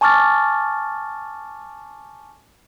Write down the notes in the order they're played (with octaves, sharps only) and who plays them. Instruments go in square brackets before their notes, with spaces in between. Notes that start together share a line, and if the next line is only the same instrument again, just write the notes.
[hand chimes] G#5 A5 C#6 D6 F6 A6